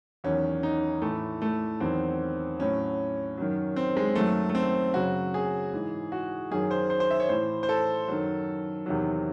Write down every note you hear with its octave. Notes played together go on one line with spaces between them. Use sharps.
E2 D#3 F#3 C#4
D#4
A2 E3 A3
A3
E2 D#3 F#3 C4
A2 F#3 C#4
F#2 D#3 F#3
C4
G#3
F#2 D#3 F#3 A3
A3
C4
F#2 C#3 F#3 F#4
G#4
G#2 E3
F#4
F#2 D#3 F#3 G#4
C5
C5
C5
E5
C#5
A2 E3 C5
C5
A4
F#2 D#3 F#3
E2 C3 D#3 F#3